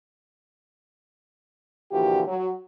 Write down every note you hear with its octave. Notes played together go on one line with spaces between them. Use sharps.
A#2 D3 E3 F3 F#4 G4
F#3